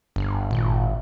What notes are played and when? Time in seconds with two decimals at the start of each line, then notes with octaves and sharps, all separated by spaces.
0.16 G1 G2
0.51 G#1 A#2